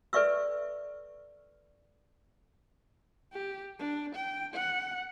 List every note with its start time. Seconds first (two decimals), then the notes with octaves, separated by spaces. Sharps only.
0.13 A4 B4 D5 E5 C#6 E6
3.33 G4
3.79 D4
4.16 G5
4.54 F#5